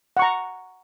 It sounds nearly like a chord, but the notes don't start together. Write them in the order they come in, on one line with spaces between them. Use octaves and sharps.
F#5 C#6 A#5